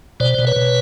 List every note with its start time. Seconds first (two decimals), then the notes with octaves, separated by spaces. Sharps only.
0.20 B2 C5 D5
0.38 B2
0.47 B4 C#5
0.56 B2